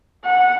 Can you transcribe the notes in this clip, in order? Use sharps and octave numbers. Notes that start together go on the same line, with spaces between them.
F#5